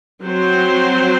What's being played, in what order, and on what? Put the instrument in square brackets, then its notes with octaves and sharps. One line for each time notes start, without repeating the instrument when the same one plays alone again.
[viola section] F#3 C4 F#4 C5